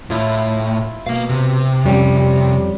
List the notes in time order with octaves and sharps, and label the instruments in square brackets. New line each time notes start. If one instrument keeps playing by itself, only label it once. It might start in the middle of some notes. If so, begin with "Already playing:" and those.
[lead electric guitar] A2 [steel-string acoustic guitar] E4 F4
[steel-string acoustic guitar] B2 [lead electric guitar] A#3 F5
[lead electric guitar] C3
[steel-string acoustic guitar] F2 G3 C#4